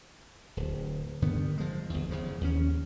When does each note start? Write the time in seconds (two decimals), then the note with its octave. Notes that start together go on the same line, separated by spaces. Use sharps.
0.57 D1
1.22 G2 D3 D#3 B3
1.58 F3 G#3
1.90 G1 E2
2.11 E2 C#3 F3
2.41 D#2 C#4